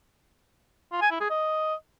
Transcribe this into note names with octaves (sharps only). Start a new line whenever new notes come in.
F4
G#5
E4
G#4
D#5